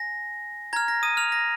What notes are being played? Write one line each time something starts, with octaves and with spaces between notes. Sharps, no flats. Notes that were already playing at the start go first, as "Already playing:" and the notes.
Already playing: G#5 A#6
A#5 F6 G#6
A#6
D#6 D#7
F6 F7
A#6